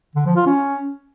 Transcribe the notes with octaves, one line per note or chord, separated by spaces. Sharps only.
D3
F3
F4
C#4